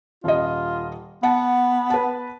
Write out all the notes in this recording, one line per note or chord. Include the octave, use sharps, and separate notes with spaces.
D#1 F4 D#5
B3 F#5 A5
B4 A5